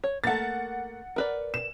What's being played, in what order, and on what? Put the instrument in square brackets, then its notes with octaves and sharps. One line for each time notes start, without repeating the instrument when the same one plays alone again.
[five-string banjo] C#5
[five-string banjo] A3 A#3 [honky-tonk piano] F#5 A6
[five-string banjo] A#4 B4 D5
[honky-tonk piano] E7